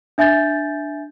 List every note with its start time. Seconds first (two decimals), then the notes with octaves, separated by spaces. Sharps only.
0.18 D4 E5 G#5 G6 A6